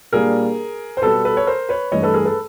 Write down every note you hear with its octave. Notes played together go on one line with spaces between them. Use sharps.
A#2 G3 A#3 D4 G#4 A#4
C5
B2 G3 B3 A4 B4
A4 B4
C#5
A#4 C5
B4 C#5
G2 E3 A3 C#5 D#5
A4 B4
G#4 A#4
A4 B4